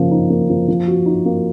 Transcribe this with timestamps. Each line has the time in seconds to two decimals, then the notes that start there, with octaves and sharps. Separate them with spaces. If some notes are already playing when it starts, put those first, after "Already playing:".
Already playing: C#3 F3 A#3
0.11 D#4
0.30 A#3
0.50 F3
0.68 F3
0.88 F#4
1.06 D#4
1.25 A#3